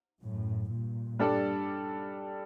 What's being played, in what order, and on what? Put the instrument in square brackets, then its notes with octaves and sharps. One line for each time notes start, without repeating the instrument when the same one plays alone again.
[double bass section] F#2 A2
G2 A#2
[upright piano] G3 D4 A4 D5